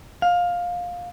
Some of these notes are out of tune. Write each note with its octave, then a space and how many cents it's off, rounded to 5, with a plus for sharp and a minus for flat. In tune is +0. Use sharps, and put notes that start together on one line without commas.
F5 +15